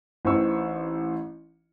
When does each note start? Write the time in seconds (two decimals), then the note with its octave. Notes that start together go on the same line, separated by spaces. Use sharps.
0.25 A1 E3 C4 D#4 C#6 E6